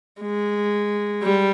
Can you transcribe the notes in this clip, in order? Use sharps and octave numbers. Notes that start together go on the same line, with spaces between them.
G#3
G3